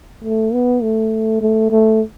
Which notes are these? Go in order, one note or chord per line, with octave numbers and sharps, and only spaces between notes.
A3
B3
A3
A3
A3